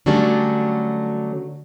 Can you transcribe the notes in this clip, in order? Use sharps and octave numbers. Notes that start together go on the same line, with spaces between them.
D3 F#3 G3 A3 C#4 D4